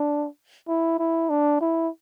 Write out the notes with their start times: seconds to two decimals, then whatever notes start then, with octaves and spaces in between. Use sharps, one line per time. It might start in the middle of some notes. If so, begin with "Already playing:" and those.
Already playing: D4
0.68 E4
0.99 E4
1.29 D4
1.61 E4